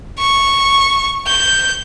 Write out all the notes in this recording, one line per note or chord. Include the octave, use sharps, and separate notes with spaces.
C#6
G6